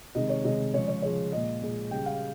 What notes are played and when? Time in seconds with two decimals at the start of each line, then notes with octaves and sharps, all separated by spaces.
0.15 C3 D#3 G#3 D#5
0.30 C#5
0.44 C3 D#3 G#3 D#5
0.74 C#3 F3 G#3 C#5
0.88 C#5
1.02 C#3 F3 G#3 C#5
1.32 A#2 G#3 D#5
1.62 A#2 G#3
1.91 C#3 G3 G5
2.06 F5